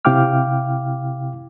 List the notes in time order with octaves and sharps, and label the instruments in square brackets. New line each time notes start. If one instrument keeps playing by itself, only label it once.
[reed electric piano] C3 E4 F5 G5 D6 F6